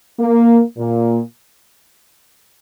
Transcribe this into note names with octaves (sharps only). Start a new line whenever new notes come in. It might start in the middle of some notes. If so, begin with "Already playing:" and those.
A#3
A#2